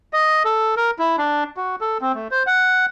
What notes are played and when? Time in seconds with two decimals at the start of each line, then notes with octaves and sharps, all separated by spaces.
0.13 D#5
0.45 A4
0.77 A#4
0.99 E4
1.18 D4
1.57 F#4
1.81 A4
2.01 C4
2.15 A3
2.31 C5
2.47 F#5